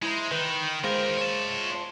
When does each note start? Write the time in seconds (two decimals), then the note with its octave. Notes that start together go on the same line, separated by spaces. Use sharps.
0.02 G#3 E4 C5 A#5
0.31 D#3 B4
0.84 D#2 G#3 F4 A#4 C5
1.18 C#5 A5